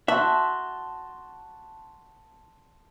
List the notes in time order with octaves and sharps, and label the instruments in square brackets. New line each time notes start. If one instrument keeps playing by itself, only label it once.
[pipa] F#4 [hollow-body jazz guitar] E5 [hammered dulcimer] A5 C6